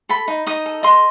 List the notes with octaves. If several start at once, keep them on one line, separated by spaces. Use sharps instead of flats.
A4 B5
D#4
D#4 D#6
A4
D#5 C6